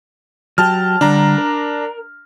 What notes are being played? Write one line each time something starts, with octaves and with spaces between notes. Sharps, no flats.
F#3 G4 A5 F6
D3 G3 D4 A#5
A#4